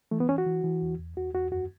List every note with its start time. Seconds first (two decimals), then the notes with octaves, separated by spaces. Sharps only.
0.11 E3 A3
0.20 B3
0.29 E3 C#4
0.38 F#4
0.46 E3
0.64 E3
0.82 E2
0.99 E2
1.17 E2 F#4
1.34 E2 F#4
1.52 F#2 F#4